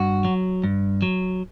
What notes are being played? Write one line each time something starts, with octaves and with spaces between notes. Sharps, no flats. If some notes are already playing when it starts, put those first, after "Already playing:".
Already playing: G2 F#4
F#3
G2
F#3